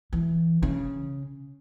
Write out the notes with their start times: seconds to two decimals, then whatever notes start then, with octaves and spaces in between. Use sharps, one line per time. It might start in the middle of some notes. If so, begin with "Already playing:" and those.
0.13 E3
0.63 C#3